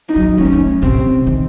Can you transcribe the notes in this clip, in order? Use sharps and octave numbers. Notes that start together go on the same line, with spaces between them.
D#4
F#3
A3 C#4
C4
A3
C3 C4
D#3